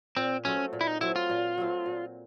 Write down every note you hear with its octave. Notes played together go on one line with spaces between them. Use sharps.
A#2 C4
F#3 A3 C4 C#4
A#2
E4
D#4
F#3 A3 C4 E4
F4
A#2
F#3 A3 C4
A#2